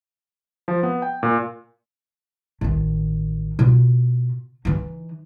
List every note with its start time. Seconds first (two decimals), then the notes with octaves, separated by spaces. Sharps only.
0.68 F3
0.83 B3
1.02 G5
1.23 A#2
2.61 A1 D#3
3.59 B2 F4
4.65 E3 D#4